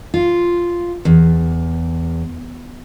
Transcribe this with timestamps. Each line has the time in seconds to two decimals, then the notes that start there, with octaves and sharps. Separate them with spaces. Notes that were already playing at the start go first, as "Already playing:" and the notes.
0.14 F4
1.05 E2